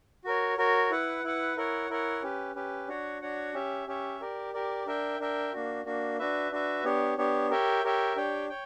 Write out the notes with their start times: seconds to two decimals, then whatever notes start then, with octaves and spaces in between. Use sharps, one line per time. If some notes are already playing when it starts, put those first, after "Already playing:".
0.25 F#4 A#4 C#5
0.58 F#4 A#4 C#5
0.91 E4 B4 F#5
1.24 E4 B4 F#5
1.57 E4 A#4 C#5 F#5
1.90 E4 A#4 C#5 F#5
2.23 C#4 G4 B4
2.55 C#4 G4 B4
2.88 D4 F#4 C#5 F#5
3.22 D4 F#4 C#5 F#5
3.54 C#4 G4 C#5 E5
3.87 C#4 G4 C#5 E5
4.20 G4 A#4 D5
4.53 G4 A#4 D5
4.86 D4 A#4 E5 G5
5.19 D4 A#4 E5 G5
5.53 A#3 D4 F#4
5.85 A#3 D4 F#4
6.19 D4 F#4 B4 E5
6.51 D4 F#4 B4 E5
6.84 B3 D4 G4 C#5
7.18 B3 D4 G4 C#5
7.50 G4 A#4 C#5 E5 G5
7.84 G4 A#4 C#5 E5 G5
8.16 D4 G4 C#5 G5
8.49 C#5 G5